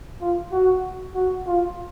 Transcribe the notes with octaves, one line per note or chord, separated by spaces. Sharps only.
F4
F#4
F#4
F4